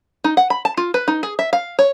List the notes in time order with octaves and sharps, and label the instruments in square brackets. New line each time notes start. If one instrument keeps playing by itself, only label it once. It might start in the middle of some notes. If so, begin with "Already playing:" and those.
[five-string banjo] D#4
F#5
B5
A5
F4
B4
D#4
G#4
E5
F5
C#5